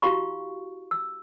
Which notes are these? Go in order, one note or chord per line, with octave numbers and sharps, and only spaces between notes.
E4 F#4 G4 F5 B5 C#6
E6